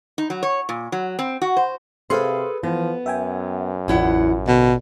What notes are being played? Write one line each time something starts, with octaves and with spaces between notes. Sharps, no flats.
D#4
F#3
C#5
A#2
F#3
C4
F#4
C5
C3 G#4 A4 B4 C5 F5 C6
E3 F3 B3
F#2 E5 G5 G#5
A1 E2 E4 F4 F#5
B2 D3